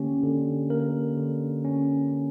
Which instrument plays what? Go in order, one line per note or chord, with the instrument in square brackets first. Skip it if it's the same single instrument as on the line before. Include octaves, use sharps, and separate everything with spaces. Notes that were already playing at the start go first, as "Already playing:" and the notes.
Already playing: [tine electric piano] D3 A#3 C#4 G4
D3
A#3 A#4
D3
C#4